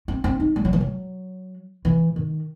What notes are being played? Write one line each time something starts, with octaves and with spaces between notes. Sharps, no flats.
C4
C4
D#4
G3
F#3
E3
F#3
E3
D#3